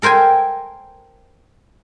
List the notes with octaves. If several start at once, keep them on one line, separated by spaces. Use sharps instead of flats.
A4 A#4 C5 G5 G#5